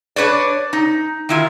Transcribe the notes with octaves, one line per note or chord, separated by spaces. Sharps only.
D4 B4 C#5 D5
D#4
D#3 E4 F4